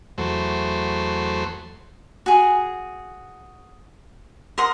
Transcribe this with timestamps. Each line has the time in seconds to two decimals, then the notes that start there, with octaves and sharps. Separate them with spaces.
0.18 E2 F#3 A3 C5
2.26 F#4 G#4
4.58 A#4 F#5 C6 D#6